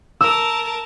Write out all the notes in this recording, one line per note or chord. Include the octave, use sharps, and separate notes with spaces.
A#4 A5 E6